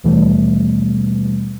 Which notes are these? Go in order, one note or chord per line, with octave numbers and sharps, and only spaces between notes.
D#2 B2 E3 G3 A3